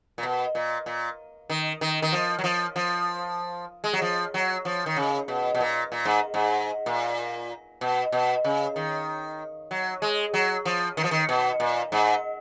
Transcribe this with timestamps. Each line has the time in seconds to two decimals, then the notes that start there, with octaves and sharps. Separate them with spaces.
0.18 A#2
0.23 B2
0.55 A#2
0.86 A#2
1.50 D#3
1.81 D#3
2.02 D#3
2.13 F3
2.39 F#3
2.44 F3
2.76 F3
3.84 G#3
3.93 F#3
4.02 F3
4.34 F#3
4.65 F3
4.86 D#3
4.96 C#3
5.28 B2
5.55 B2
5.60 A#2
5.92 A#2
6.05 G#2
6.34 G#2
6.86 A#2
7.81 B2
8.12 B2
8.44 C#3
8.76 D#3
9.71 F#3
10.02 G#3
10.34 F#3
10.65 F3
10.97 D#3
11.04 F3
11.11 D#3
11.29 B2
11.60 A#2
11.92 G#2